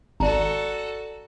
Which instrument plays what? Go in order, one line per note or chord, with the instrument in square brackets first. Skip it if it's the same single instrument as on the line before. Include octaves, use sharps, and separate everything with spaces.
[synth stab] G#1 [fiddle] F#4 A4 [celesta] D5 A5 A#5